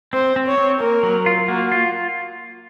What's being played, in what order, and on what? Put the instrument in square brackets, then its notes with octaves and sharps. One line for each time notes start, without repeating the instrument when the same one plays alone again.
[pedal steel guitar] C4 [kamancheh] C5
[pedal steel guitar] C4
[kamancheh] C#5
[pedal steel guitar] C4
[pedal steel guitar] A#3 [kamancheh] A#4
[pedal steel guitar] F#3
F4
[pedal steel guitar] A#3 [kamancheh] F#4
[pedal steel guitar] F4